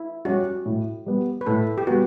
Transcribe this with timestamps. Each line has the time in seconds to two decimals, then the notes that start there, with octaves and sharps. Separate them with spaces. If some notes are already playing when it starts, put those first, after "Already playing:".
Already playing: E4
0.25 G3 C#4 F#4 G4
0.66 A2
1.06 G3 B3
1.41 B4
1.46 A2 A4
1.78 G4
1.87 G3 B3 F#4